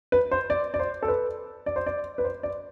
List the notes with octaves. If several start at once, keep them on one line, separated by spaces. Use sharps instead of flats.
B4
C5
D5
D5
C5
A4
B4
D5
C5
D5
B4
C5
D5